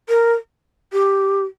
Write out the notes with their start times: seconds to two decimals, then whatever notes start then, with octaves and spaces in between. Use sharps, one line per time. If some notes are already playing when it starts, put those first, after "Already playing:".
0.09 A#4
0.93 G4